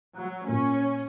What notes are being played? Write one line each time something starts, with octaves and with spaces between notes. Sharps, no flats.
F#3
A#2 C#4